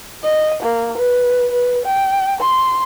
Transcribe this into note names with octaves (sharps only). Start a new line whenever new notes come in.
D#5
A#3
B4
B4
G5
C6